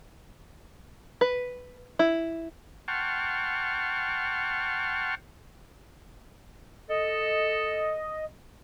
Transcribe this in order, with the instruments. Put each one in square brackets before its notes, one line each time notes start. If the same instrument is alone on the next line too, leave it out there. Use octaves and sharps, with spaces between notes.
[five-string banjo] B4
E4
[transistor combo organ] F#5 G5 A5 C6 C#6 F6
[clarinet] A4 [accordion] D#5